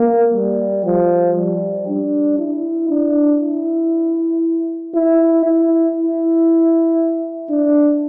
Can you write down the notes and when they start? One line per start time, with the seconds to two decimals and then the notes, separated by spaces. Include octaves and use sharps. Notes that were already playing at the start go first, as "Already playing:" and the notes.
Already playing: A#3
0.34 G3
0.85 F3
1.37 G3
1.88 D4
2.39 E4
2.90 D4
3.41 E4
4.95 E4
5.45 E4
5.96 E4
7.50 D4